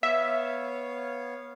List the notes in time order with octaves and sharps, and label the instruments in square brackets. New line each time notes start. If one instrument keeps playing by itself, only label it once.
[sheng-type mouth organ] B3 C#5 F5 [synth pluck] E5